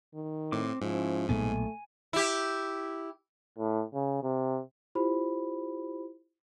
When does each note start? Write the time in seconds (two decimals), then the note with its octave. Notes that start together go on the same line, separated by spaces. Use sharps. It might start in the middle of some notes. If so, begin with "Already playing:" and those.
0.14 D#3
0.52 A2 C4 D6
0.82 G#2 F3 C#4 E4
1.29 B1 A#2 A3 B3 G#5
2.13 E4 G4
3.58 A2
3.94 C#3
4.23 C3
4.95 E4 F4 G4 C5 B5